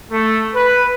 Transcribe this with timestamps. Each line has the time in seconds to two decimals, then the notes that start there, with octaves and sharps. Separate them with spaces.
0.11 A3
0.54 B4